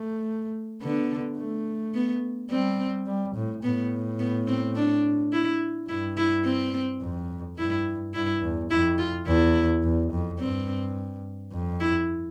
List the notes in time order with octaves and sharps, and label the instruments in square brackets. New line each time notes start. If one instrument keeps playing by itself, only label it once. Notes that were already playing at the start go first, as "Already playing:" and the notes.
Already playing: [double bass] A3
[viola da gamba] D3 [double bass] B3
[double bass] A3
[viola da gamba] B3
[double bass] G3 [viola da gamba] C4
[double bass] G3
A2
[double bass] A2 [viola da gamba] B3
[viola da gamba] B3
C4
D4
E4
[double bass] G2 [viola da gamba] E4
[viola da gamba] E4
C4
[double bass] F2
[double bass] G2 [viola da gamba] E4
[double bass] G2 [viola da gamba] E4
[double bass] E2
[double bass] F2 [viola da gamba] E4
[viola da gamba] F4
[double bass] E2 [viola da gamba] E4
[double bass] E2
F2
[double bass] G2 [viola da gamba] C4
[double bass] F2
[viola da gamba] E4